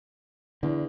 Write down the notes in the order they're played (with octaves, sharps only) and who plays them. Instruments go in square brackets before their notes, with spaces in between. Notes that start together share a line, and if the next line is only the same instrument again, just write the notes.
[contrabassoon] E2 [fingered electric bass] D3